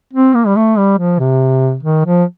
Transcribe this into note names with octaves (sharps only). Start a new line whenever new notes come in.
C4
A#3
G3
A3
G3
F3
C3
D#3
F3